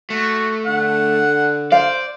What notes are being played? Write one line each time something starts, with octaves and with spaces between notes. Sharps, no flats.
A3 F#4
D3 F#5
C5 D5 F5